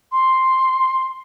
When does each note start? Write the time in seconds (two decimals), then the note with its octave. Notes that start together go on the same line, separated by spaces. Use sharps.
0.11 C6